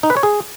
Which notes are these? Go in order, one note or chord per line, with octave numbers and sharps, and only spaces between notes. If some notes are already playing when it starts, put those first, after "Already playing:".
D#4
B4
C#5
G#4